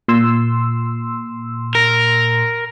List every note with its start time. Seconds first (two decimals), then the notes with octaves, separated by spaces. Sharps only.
0.08 A#2 C6 E6
1.75 A#4